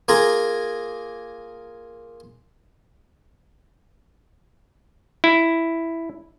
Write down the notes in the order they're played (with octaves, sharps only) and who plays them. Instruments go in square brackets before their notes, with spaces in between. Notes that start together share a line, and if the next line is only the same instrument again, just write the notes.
[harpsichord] A#3 F4 G#4 A#5
[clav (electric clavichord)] E4